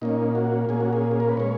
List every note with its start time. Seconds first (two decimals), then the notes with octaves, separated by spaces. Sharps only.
0.02 A#2 A#3 C#4 D#4
0.35 F#4
0.69 A#2 A#3 C#4 G#4
0.80 F#4
0.93 G#4
1.11 G#4
1.20 A#4
1.29 B4
1.37 A#2 G#3 C#4 C#5